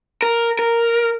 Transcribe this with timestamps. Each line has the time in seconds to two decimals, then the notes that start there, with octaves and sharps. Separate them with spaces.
0.22 A#4
0.59 A#4